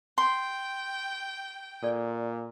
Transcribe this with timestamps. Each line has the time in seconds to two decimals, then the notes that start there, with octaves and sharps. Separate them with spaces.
0.18 G5 C6
1.83 A#2 A4 D5